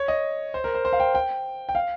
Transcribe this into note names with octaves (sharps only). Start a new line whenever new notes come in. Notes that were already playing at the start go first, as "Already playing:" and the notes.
Already playing: C#5
D#5
C5
A#4
C5
C5
F5
G5
G5
G5
F5